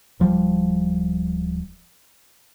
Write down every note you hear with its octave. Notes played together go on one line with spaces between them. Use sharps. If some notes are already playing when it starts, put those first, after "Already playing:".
D1 F3 G3